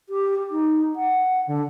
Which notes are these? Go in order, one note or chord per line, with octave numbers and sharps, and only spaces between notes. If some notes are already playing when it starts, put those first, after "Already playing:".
G4
D#4
F#5
D3